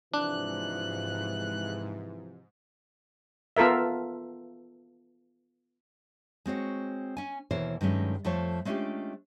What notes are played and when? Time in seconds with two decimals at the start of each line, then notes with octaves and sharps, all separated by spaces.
0.14 G#2 C3 E3 F3 D4 F#6
3.57 B3 F4 A4 A#4 E5
6.46 G#3 C4 F#4 C#5
7.17 C#4 G#5
7.51 D#2 B2 E3 A#4 C5 C#5
7.81 G2 D#3 F#3 G#3 A3 C#4
8.25 F2 F3 A3 C#5 A5
8.65 G#3 A3 C#4 D4 F4 G4